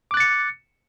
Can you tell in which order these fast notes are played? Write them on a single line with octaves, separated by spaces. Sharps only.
D6 F#6 A6 C#7